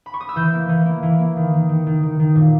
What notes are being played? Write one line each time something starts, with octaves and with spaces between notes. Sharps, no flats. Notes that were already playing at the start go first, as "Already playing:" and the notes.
B5
C#6
D#6
E6
E3 G6
A#3
E3
A#3
E3
A#3
D#3
D#3
D#3
D#3
D#3
D#3
A#2